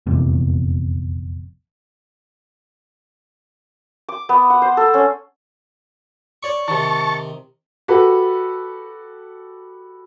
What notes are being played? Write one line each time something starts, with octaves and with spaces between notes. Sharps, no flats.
F1 A#1 E2 C3
D6
B3
F#5
C5
A4
C#4
C#5 D5 C#6
C3 D#3 A5 C#6
F#4 G4 A4 B4